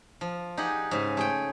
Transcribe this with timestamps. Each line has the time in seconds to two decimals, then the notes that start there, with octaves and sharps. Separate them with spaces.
0.21 F3
0.57 D#4 G4 G#4 F#5
0.91 G#2 C#3 G#4
1.17 A3 G#4 G5